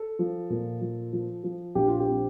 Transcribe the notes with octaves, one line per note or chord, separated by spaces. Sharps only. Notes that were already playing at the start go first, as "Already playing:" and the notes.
Already playing: A4
F3
A#2
F3
F3
F3
A#1 G4
F4
G4
C4